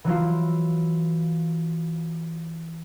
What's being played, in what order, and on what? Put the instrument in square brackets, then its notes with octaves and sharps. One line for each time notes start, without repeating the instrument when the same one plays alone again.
[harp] E3 F#3 E4 F4